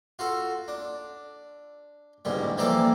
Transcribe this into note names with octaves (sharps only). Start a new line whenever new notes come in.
F4 F#4 A4
D4
A1 D2 G#2 G3
E3 F3 G3 A#3 A4 D5